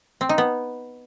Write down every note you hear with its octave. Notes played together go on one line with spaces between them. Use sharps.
C4
D#4
B3